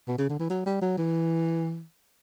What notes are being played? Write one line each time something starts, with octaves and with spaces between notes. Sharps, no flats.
B2
C#3
D3
E3
F#3
G3
F#3
E3